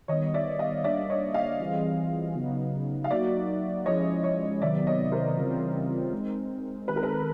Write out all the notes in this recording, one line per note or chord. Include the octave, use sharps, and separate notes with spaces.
D#3 G3 B3 C#5 D#5
D5 E5
D#5 F5
G3 A#3 D4 D5 E5
C#5 D#5
D#5 F5
E3 G3 C4 F4 G#4
C#3 F#3 B3 D#4
F5
F#3 A#3 D#4 F#4 D5 E5
F3 G#3 C#4 E4 C#5 D#5
C#5 D#5
C3 D#3 F#3 B3 D5 E5
C#5 D#5
A#4 C5
C#3 E3 G3 C4 F4
G#3 C4 D#4
D#3 G#3 C4 B4
A#4
A4 B4